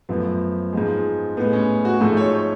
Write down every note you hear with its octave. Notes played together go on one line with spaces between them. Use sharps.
F#2 F3 A3 B3
G#2 F3 G#3
A2 G#3 B3
C#4
F#4
G#2 F3 A3 A4
C#5
C#5